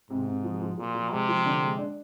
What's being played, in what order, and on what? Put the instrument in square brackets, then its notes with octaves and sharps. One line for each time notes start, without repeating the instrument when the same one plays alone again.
[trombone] G#2 [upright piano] C3
[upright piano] C3
F3
F3
[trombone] A#2 [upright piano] F3
[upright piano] F3
[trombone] C3 [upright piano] G#3
[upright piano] F3
D3
G#3
D4